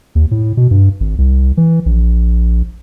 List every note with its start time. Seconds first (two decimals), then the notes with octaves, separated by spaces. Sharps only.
0.15 D#2
0.31 A2
0.57 B2
0.71 G2
1.00 G#1
1.18 C2
1.57 E3
1.86 A#1